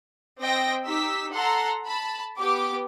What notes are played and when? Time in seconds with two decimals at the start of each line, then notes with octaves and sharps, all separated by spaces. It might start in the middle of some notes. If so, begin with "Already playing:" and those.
0.41 C4 D#5 G5 A#6
0.85 D#4 G4 E6 B6
1.32 A4 F#5 A#5 C6
1.86 A5 B5
2.38 B3 G4 D6